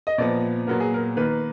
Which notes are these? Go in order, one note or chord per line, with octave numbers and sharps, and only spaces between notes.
D#5
A#2 F3 B3 D5
A#2 F#3 B3 A#4
G#4
A#4
D#3 A#3 B4